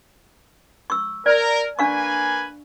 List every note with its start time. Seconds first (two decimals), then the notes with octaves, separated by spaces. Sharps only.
0.90 C#6 E6
1.26 A#4 D5
1.79 A#3 D4 B4 F5 G#5 C#6